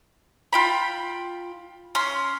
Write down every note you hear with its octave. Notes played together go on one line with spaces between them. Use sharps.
F4 G5 B5
C#4 C6